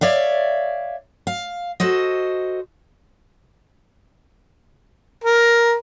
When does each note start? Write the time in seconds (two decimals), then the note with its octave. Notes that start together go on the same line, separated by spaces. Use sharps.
0.01 C#5 D5 E5 F5
1.27 F5
1.80 F#4 A4 C5 D#5
5.24 A#4